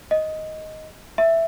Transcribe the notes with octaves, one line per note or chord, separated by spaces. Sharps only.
D#5
E5